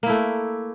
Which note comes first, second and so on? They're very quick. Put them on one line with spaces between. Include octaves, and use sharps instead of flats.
A#3 E4 A3